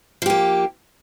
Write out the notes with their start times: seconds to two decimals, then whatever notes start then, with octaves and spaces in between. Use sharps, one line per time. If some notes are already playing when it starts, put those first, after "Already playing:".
0.22 F3
0.26 G4
0.30 A#3